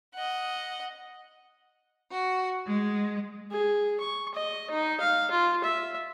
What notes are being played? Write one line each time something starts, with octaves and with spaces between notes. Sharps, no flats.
D#5 F#5
F#4
G#3
G#4
C#6
D#5
D#4
F5
F4
E5